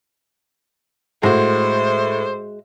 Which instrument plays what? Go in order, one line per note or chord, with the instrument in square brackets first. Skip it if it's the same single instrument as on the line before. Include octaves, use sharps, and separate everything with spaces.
[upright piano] A2 [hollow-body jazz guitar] G#3 F#4 [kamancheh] C5